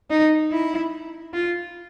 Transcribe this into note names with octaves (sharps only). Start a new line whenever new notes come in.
D#4
E4
F4